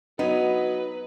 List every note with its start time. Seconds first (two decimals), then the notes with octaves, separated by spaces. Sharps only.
0.19 F#3 B3 D#4 B4